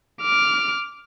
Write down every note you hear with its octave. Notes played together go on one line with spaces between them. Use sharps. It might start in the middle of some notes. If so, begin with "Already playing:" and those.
D6 F6